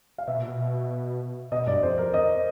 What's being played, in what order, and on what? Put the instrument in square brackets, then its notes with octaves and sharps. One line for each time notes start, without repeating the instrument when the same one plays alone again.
[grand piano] F5
[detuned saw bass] B2 [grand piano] E5
[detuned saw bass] A#2
B2
[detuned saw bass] B2 [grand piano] D#5
[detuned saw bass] G2 [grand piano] D5
[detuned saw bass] F2 [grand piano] C5
[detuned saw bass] F2 [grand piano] A#4
[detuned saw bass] E2 [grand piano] D#5